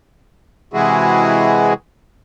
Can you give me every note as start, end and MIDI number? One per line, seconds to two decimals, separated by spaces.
0.73 1.73 48
0.73 1.73 52
0.73 1.73 56
0.73 1.73 64
0.73 1.73 66
0.73 1.73 68